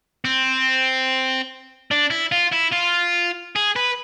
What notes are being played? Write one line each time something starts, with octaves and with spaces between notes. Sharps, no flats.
C4
D4
E4
F4
E4
F4
G#4
B4